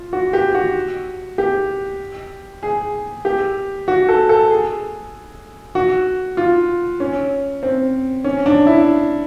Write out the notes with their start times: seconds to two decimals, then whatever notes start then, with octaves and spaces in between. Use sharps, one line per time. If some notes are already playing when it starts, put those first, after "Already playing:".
Already playing: F4
0.13 F#4
0.33 G4
0.55 F#4
1.38 G4
2.63 G#4
3.25 G4
3.88 F#4
4.09 A4
4.29 A4
4.50 G#4
5.75 F#4
6.37 F4
7.00 C#4
7.63 C4
8.24 C#4
8.46 D4
8.67 E4